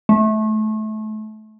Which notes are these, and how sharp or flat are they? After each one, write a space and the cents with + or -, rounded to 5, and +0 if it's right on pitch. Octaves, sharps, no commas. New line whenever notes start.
A3 -25